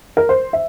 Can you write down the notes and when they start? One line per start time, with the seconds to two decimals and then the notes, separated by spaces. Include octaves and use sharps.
0.17 A#4
0.29 C5
0.53 E5